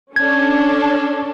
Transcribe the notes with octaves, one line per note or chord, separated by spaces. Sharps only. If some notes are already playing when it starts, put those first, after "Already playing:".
C#4 D4 A4 G#6